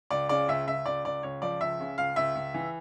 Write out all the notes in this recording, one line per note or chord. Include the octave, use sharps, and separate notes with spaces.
C#2 D5
C#3 D5
C#2 E5
C#2 E5
C#2 D5
C#2 D5
C#2 C#5
F3 D5
C#2 E5
C#3
C#2 F5
C#2 E5
C#2
E3